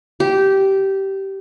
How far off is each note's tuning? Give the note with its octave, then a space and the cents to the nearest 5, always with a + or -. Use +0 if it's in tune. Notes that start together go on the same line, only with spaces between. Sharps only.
G4 -15